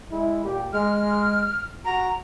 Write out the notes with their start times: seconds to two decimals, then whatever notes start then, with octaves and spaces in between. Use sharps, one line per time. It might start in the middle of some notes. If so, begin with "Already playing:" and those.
0.11 G#3 E4
0.44 A#2 G4
0.73 G#3 F6
1.85 F#4 A#5